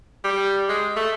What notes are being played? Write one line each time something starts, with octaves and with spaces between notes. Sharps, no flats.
G3
G#3
A3